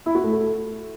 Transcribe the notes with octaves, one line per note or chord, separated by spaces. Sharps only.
E4
F#4
A3
A4